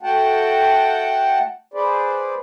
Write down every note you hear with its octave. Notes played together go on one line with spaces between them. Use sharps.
A3 F#4 F#5 G5 A5
G#4 B4 C5 D5